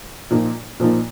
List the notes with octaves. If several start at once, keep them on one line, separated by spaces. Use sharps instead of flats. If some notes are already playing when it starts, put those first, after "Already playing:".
A#2 F3 A#3 D#4
A#2 F3 A#3 D#4